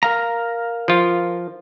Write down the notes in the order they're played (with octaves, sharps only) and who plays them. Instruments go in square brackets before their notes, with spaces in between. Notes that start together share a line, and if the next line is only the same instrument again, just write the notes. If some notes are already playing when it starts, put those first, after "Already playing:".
[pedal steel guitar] A#4 F5 A#5
[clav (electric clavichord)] F3 F4